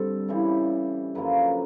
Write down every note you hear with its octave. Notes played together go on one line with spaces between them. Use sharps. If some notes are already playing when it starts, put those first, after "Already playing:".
Already playing: G2 D3 G3 C4 A4
C#3 E3 G3
F#2 D3 F3 A#3 B4